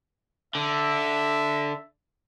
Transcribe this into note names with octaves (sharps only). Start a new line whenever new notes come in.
D3 E5